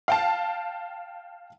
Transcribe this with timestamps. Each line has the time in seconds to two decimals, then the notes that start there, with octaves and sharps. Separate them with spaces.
0.08 F5 G5 A5